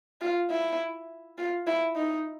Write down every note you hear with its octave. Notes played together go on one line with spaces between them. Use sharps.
F4
E4
F4
E4
D#4